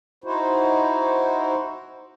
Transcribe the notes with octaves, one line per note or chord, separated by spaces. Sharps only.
D#4 E4 F#4 C5